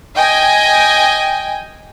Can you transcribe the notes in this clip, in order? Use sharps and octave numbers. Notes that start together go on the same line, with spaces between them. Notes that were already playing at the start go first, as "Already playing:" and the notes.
D#5 G5 G#5